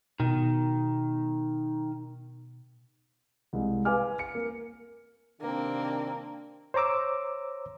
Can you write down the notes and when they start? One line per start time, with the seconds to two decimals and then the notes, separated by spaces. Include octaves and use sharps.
0.20 B2 D#3
3.53 C2 G#3
3.85 B4 F5 G#5 D6 F6
4.19 C#7
4.35 A#3
5.41 C3 D#3 A#3 C4 D4
6.74 C5 C#5 A#5 D6 E6